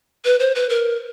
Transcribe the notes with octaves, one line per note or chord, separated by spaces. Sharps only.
B4
C5
B4
A#4